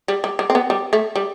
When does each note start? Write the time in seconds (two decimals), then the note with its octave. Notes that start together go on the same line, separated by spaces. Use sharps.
0.08 G3
0.24 G3
0.39 G3
0.50 C4
0.55 B3
0.70 G3
0.93 A3
1.16 G3